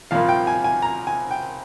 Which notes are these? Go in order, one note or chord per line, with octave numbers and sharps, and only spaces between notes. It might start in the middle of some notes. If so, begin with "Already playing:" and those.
C2 A#2 F3 F5
G5
G#5
G#5
A#5
G#5
G5